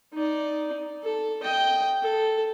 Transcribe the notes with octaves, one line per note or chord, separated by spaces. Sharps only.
D#4 D5
A4
D#5 G5
A4